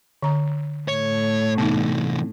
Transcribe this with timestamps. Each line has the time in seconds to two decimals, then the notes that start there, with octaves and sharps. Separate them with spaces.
0.23 D3 A#5
0.88 A2 C#5
1.58 C3 E3 B3 D#4